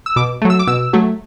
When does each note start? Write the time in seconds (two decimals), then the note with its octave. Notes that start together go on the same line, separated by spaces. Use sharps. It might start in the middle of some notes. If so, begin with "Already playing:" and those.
0.06 E6
0.16 B2 D6
0.42 F#3 A3
0.50 E6
0.59 D6
0.67 B2 E6
0.93 F#3 A3